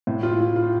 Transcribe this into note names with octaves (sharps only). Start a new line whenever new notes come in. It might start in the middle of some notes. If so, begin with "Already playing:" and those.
A2
F4
F4
F4